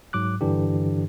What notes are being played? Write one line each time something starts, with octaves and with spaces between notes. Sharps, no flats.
G#2 F#3 D6 F#6
G2 D3 E3 D4 G4